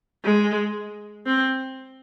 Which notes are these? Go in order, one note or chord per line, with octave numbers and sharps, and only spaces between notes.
G#3
C4